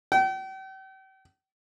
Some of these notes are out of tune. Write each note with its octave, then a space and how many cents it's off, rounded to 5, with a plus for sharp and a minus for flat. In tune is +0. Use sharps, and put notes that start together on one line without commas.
G5 -40